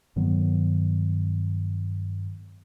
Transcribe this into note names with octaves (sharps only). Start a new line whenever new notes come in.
G2 D#3 F#3 B3